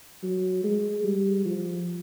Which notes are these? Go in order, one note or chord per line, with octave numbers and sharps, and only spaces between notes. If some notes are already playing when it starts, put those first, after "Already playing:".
F#3
G#3
G3
F3